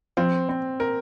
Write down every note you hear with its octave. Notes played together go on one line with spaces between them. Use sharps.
F3 C4
C4
A#4